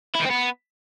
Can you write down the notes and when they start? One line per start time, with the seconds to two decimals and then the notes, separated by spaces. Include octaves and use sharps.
0.15 E4
0.20 D#3
0.25 C4
0.31 B3